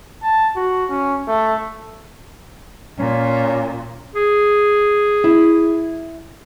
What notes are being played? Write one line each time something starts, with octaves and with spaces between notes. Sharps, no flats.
A5
F#4
C#4
A3
A#2 C#4
G#4
E4